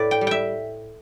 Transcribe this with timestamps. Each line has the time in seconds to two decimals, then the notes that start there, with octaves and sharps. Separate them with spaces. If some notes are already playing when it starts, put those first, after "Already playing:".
Already playing: A2 B4 D5
0.11 G5
0.21 G3
0.27 E5 G5